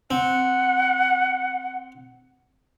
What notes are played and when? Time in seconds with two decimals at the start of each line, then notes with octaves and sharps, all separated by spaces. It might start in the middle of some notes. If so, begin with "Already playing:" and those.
0.11 C4 F#5